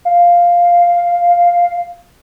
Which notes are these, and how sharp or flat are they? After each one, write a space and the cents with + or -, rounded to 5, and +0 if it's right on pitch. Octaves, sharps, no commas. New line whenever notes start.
F5 +0